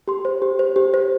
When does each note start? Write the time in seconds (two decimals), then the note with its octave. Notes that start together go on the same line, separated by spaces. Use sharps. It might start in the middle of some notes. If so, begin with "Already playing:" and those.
0.08 G4 C6
0.25 C5
0.42 G4
0.59 C5
0.76 G4
0.94 C5